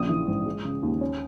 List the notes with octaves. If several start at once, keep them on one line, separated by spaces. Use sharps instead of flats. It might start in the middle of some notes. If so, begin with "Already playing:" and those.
Already playing: A#1 C#3 D#6
E3
G#2
G#3
C#3
D#2
C#4